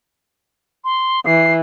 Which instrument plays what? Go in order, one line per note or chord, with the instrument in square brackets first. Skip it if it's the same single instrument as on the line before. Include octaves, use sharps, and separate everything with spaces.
[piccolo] C6
[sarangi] E3 [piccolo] C7